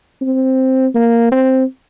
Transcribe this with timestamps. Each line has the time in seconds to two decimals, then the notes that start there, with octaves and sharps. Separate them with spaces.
0.22 C4
0.95 A#3
1.32 C4